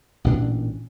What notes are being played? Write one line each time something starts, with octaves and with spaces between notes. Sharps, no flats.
A1 A#2 D4